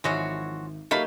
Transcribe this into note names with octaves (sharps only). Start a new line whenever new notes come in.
G#1 E3 F3 G#3 F#4 C#5 E5
F#3 A3 A#3 D#4 G4 A#4 F5 B5